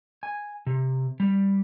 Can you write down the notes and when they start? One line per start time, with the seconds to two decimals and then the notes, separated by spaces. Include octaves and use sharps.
0.23 G#5
0.66 C3
1.20 G3